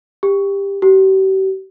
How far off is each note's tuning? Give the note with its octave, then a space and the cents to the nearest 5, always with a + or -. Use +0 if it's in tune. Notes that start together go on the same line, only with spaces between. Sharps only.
G4 +20
G4 -40